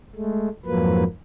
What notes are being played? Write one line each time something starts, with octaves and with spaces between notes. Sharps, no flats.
G#3 A3
F2 G#2 F3 F#3 A#3 B4